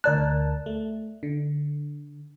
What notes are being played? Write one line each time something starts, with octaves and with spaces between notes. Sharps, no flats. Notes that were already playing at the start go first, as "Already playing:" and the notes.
D2 A#4 D5 A5 F#6
A3
D3